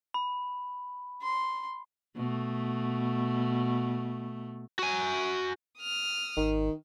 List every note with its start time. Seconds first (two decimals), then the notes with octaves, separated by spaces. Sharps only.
0.14 B5
1.22 C6
2.16 B2 A3
4.79 F#4 G#5
5.79 D#6 F6
6.37 G#1 D#3